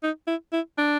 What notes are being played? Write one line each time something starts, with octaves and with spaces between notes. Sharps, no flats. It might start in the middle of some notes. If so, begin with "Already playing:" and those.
D#4
E4
E4
D4